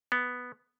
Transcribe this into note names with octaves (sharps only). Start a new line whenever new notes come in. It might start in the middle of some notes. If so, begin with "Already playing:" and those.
B3